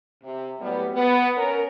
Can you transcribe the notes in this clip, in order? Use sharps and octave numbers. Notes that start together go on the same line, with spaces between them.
C3
A2 F#3 G3 B3
B3
C#4 A#4